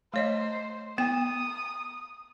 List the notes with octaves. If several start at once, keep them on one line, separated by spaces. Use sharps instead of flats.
A3 C5 C#5 D#5
B3 G5 D#6